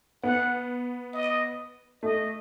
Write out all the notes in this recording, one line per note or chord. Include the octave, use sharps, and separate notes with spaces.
B3 F#5
D#5
A3 D#5